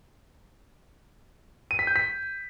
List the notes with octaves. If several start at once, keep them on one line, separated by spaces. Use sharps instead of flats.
D#7
B6
G6
B6